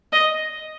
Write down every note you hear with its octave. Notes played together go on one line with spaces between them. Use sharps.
D#5